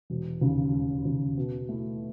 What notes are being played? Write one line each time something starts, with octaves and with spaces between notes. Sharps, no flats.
E1
D#2 C#3
E1
D#2 C#3
B2
A3 E4